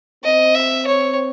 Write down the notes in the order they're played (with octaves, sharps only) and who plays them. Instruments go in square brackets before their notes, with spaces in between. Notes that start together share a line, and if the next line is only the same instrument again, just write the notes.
[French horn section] C4 [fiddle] D#5
[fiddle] E5
C#5